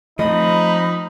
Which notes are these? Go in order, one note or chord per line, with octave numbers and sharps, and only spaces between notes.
F3 A3 C4 D#4 D#5 B5